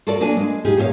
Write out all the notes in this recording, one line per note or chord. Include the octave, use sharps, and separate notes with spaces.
F4 F#4 A4 A#4 D5
F#3 A#3 D4 B4 G#5
G#3
D#4 F4 G4 G#4
E2 A#2 F4 C#5 F5